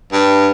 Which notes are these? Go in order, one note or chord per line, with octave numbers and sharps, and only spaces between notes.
G2